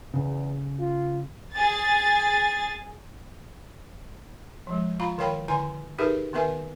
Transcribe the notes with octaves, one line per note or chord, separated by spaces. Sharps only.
E2 C#3
F4
G#4 A6
F3 G#3
F4 F5 A#5 B5
D#3 A#4 C#5 F5 G5 B5
D3 E4 G#5 C6
D#4 G4 G#4 A#4 B4 E5
D#3 B3 A#4 B4 E5 G#5